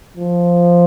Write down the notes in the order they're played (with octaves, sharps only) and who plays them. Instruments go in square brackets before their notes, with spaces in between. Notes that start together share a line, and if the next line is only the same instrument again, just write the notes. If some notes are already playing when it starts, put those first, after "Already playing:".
[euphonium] F3